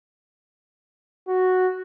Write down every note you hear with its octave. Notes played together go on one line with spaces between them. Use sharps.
F#4